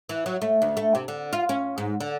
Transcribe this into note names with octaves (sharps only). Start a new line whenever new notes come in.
E3
F#3
A3
D2
A3
C3
D3
F4
C#4
G#2
D3